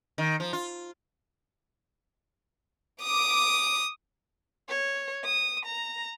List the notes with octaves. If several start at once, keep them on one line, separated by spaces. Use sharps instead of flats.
D#3
F3
F4
D6 D#6
C#5
D#6
A#5